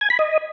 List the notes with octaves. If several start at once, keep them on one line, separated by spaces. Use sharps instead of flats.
G#5
B5
D#5